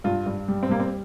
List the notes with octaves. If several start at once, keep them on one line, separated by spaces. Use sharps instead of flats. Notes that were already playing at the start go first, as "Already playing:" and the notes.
G2 F4
G2
G3
C4
G3 A#3
C4